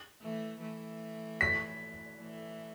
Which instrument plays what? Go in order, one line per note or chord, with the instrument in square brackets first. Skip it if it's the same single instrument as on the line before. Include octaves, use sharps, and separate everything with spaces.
[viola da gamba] E3 A3
E3 A3
[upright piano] B6
[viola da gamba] E3 A3